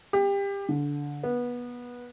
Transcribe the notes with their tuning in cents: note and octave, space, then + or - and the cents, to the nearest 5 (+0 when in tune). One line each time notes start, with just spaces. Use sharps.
G4 +25
D3 -20
B3 -20